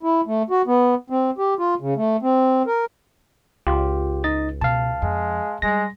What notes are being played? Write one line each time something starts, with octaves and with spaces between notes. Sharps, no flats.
E4
A3
F#4
B3
C4
G4
F4
C#3
A3
C4
A#4
C#2 F4 G4
D#4 D#5 A6
B2 F5 A5
F2 G#3
G3 G#3 A#6